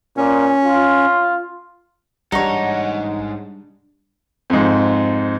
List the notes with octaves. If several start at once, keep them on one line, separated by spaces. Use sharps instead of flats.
A#2 C#4
F4
A1 G#2 G3 D4 D#4 C#5 F#5
F2 G#2